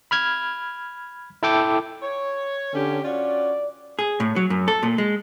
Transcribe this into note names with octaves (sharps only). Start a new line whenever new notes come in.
B5 F6 G#6
E4 A4 G5 D6
C#5
D3 C#4 G4
C#4 F4 F#4 D5
G#4
A2
F#3
F#2
A4
A#2
G#3